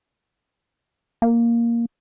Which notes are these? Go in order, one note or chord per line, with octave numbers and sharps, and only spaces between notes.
A#3